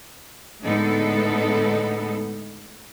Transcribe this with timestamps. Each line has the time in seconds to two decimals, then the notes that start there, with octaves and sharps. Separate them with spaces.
0.64 A2 D3 G#3 B3 D#4 A4